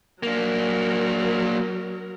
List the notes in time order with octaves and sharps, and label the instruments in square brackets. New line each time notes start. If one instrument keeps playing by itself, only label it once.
[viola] F#3 A#4 [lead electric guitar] A#3 D4